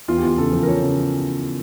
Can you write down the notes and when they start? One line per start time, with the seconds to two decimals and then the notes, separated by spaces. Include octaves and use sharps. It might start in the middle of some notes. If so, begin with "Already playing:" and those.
0.08 E2 F4
0.17 G4
0.22 E2 F4
0.37 C#3 A4
0.52 F3
0.63 A#4
0.67 F3 C#5
0.82 C#3